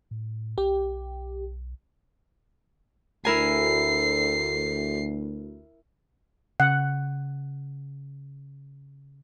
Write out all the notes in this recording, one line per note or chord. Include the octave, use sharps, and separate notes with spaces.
A2
B1 G4
D2 E4 A#4 G#5 C7
C#3 F#5